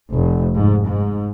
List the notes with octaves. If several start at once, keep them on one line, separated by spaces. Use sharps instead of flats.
F1
G#2
G#2